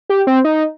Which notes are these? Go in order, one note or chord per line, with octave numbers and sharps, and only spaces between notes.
G4
C4
D#4